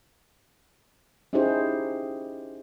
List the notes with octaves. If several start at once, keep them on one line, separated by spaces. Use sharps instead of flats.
C#4 D#4 E4 G4 G#4 C5